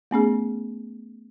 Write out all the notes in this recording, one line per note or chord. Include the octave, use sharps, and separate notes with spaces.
A3 B3 C#4 G#4